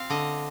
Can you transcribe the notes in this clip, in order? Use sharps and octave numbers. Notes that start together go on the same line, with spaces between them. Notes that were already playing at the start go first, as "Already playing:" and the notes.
Already playing: C4 F4 F5
D3 D#5